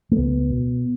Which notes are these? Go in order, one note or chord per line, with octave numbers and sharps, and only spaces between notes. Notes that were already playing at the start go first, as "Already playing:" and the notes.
A3
C#2 B3
B2